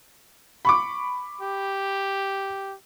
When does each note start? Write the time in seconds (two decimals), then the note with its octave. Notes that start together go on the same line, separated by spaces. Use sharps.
0.65 B5 C#6 D6
1.41 G4